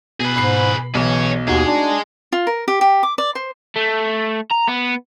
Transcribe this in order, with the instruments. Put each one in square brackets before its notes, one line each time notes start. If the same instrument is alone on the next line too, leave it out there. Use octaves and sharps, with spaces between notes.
[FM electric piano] B2 [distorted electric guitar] G#4 B4
[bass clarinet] G#2 [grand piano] B5 C7
[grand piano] B1 [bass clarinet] E3 [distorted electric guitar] G#4 C#5
[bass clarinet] D#2 [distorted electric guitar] G#3 G#4 [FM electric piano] D#4 F#4
[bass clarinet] D4
[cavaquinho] F4
A#4
G4
G4
D6
D5
C5
[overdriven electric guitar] A3
A#5
B3